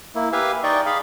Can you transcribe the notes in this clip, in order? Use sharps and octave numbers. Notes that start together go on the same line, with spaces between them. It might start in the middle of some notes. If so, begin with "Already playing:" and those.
A#3 E4
G4 B4 E5 F5 G#5
D#4 D5 D#5 G5 C#6
G#4 F5 B5